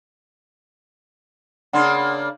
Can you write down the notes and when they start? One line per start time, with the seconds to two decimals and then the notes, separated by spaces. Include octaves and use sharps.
1.73 C#3 A#3 D4 F#5 C6